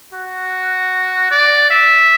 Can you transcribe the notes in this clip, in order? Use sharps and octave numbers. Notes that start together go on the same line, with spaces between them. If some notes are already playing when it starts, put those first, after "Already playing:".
F#4
D5
E5